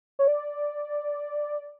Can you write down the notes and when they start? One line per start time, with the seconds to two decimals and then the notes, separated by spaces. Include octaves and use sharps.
0.19 C#5
0.27 D5